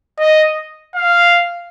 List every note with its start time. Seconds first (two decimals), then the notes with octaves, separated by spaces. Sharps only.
0.19 D#5
0.95 F5